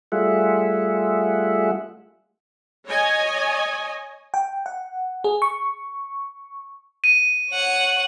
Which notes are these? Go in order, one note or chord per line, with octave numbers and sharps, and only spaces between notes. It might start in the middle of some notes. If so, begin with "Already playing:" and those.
G3 A3 F4 G#4 E5 F#5
C#5 D#5 G#5
G5
F#5
G#4
C#6
D#7
C#5 F#5